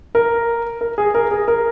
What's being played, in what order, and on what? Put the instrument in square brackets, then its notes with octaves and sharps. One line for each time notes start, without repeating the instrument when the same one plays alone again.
[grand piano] A#4
A#4
G#4
A#4
G#4
A#4